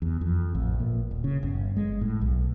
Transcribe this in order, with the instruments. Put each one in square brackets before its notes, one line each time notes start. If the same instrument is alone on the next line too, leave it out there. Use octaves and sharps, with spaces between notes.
[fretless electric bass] E2
F2
A1
A#2
D#1
C#3
G1
G#3
A2
B1